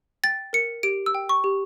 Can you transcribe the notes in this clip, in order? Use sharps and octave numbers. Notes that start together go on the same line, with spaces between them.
G5 A6
A#4 C#7
G4 D7
E6
G5
C#6
G4